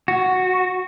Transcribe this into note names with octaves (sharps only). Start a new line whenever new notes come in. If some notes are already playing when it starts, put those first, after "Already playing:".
F#4